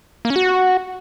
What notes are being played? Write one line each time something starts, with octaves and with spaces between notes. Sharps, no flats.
A#3
C#4
F#4